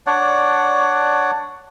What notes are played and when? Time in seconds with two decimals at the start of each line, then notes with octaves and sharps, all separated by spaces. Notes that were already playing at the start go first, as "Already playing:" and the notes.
0.07 D4 C#5 D5 F#5